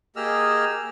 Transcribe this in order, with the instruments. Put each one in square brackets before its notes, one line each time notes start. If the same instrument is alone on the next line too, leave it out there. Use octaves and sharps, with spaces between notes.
[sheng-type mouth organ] A#3 G4 G#4 D#5 E6 F6